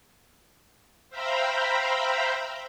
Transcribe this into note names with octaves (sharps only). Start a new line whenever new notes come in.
C5 E5 F5 G5 A#5 B5